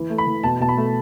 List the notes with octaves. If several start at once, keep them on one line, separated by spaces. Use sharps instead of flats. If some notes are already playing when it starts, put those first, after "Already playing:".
Already playing: E3
A3
B5
E3
B2 A5
B2 A5
B5
A3